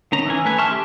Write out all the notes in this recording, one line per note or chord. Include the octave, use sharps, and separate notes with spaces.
D#3 C#4 A#5
E3 C#4 G#5
A3 B4 G#5
E5 A5 C6 C#6 F6
G4